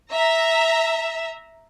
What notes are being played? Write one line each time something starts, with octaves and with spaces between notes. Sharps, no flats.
E5 A#5